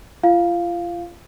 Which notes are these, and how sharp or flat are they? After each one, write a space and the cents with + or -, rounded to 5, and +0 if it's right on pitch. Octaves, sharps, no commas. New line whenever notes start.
F4 -35 F5 +0